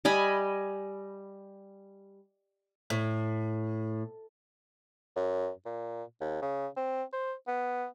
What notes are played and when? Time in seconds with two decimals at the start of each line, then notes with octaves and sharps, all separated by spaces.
0.05 G3 D#5 G#5 B5
2.90 A2
5.16 F#2
5.66 A#2
6.21 D#2
6.42 C#3
6.77 C4
7.13 C5
7.48 B3